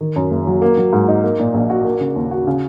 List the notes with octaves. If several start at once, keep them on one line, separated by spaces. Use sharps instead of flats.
D#3
F#2
F#1
F#3
A#3
F#3
G#2
D#4
A#3
A#2
A#1
F#4
A#3
C#3
D#2
F#4
C#3